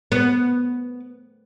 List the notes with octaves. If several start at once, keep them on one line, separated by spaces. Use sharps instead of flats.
B3